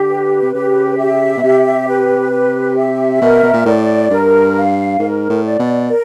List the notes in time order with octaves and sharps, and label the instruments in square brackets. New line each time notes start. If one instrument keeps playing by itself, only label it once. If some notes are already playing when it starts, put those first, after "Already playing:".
Already playing: [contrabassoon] D3 [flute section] G4
[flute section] B4
[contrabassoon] C3
[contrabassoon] C#3 [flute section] G4
[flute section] E5
[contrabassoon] B2
[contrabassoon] C3 [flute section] G4
[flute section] B4
G4
E5
[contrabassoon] B2 [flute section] A#4
[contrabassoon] B2
A#2
[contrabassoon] A2 [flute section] D5
[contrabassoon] G2 [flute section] A#4
[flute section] F5
[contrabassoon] G#2 [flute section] A#4
[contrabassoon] A2
[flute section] D5
[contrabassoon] B2
[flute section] A#4